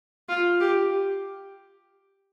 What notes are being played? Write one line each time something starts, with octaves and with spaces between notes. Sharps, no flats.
F4
G4